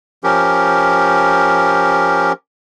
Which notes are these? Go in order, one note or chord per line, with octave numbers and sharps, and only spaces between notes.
F3 C#4 G4 A#4